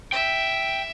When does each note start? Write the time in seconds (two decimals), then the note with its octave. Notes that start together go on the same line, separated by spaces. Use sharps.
0.13 E5 G5